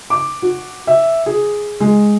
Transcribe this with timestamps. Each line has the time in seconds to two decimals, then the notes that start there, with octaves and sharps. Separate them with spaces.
0.10 D6
0.42 F#4
0.87 E5
1.26 G#4
1.80 G#3